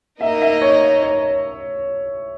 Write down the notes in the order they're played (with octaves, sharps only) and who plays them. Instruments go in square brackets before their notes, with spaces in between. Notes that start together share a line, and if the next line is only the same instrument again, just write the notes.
[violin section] A#3 D#4 A#4 D#5 [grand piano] E5
[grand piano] E5
C#5
C#5